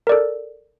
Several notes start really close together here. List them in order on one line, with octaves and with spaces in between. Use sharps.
A#4 D5 A4